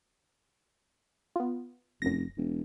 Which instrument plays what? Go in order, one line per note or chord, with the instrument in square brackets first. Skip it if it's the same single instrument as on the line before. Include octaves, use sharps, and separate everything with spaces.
[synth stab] B3 F4
[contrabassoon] F1 [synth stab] F#2 A#6
[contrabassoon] E1